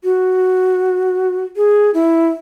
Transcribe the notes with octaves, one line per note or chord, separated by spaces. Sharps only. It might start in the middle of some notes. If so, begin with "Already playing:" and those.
F#4
G#4
E4